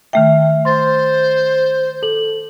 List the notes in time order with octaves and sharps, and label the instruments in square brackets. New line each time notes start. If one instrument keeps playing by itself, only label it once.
[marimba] D#3 A3 G5 [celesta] E5 F6
[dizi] C5 [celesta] C6 A6
[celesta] A4 F#7